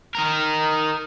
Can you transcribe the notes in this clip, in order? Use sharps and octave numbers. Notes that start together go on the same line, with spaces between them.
D#4 A#4